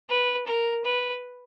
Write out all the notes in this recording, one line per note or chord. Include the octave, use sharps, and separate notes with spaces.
B4
A#4
B4